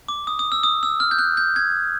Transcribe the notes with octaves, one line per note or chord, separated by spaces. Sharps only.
D6
D#6
D#6
E6
D#6
E6
F6
G6
F#6
G6
G#6